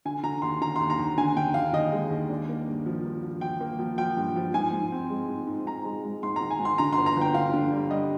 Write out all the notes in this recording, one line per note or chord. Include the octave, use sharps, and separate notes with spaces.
D3 G#5
D3 A#5
D#2 C6
D3 A#5
D#2 C6
A#5
D#2
D3 G#5
D3 G5
D#2 F5
D#2 D#5
G#3
D#2
D4
A#3
G2
F3
G2
F3
F3 G5
A#3
F3
F3 G5
G2
F3
G#2 G#5
G#2
C4
G#3
G#2
G#2
G#2 A#5
G#3
G#3
G#2 C6
D#3 A#5
G#5
G#2
C6
D3 A#5
G1 C6
A#5
G1
G5
D3 F5
D3
G3
G3 D#5